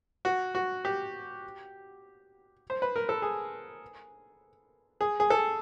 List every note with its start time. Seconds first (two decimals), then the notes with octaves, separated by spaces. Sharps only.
0.25 F#4
0.55 F#4
0.85 G4
2.70 C5
2.82 B4
2.96 A#4
3.09 A4
3.22 G#4
5.01 G#4
5.20 G#4
5.30 A4